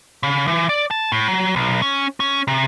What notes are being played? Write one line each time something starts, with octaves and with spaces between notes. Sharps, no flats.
C#3
E3
D5
A5
A2
F#3
B1
C#4
C#4
C3